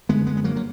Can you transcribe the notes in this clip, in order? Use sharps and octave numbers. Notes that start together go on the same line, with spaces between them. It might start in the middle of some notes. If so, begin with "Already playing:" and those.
F#2 D3 G#3 B3
G#3 B3
B3
F#3 A#3
F#3